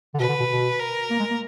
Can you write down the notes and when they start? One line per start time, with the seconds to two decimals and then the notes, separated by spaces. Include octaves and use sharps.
0.15 D3
0.19 B2 B4
0.28 D3
0.40 B2
0.50 B2
0.80 A#4
1.10 A#3
1.19 G#3
1.31 A#3